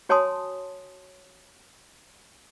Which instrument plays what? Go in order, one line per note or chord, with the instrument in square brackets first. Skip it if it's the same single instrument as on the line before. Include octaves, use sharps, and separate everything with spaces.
[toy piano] F#4 C#5 G#5 A5 C6 D#6